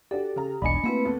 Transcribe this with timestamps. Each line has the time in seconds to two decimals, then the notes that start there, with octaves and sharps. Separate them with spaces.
0.11 D4 F#4 G4 A4 D5
0.36 C#3 A#5
0.62 E1 B1 D4 D5 D#5 G#5 B5 C#7
0.84 A3 A#3 C4 E4 F#4 B4
1.05 D2 B3 A4